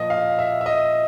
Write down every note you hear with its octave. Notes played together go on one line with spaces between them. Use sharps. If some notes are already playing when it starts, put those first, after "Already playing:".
Already playing: A#2 F3 D#5
F5
E5
E5
D#5